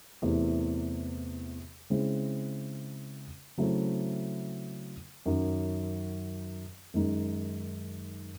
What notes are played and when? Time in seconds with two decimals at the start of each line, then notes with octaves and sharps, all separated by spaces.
0.22 E2 C3 E3 A3
1.90 C#3 G#3 C4 E4
3.58 C#3 F#3 A3 C4 E4
5.26 F#2 D#3 F#3
6.94 F#2 D#3 G#3 D#4